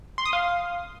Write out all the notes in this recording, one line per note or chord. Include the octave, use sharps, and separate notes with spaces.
C6
D#6
F5